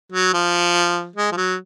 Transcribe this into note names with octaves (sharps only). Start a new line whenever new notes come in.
F#3
F3
G#3
F3
F#3